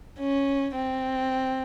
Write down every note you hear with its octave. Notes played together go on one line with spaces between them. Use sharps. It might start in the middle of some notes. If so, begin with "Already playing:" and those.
C#4
C4